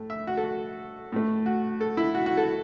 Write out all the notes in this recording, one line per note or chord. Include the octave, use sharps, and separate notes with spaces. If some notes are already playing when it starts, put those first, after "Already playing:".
Already playing: A2 A3
E5
F#4
A4
F#4
A2 A3
F#4
A4
E4
F#4
F#4
A4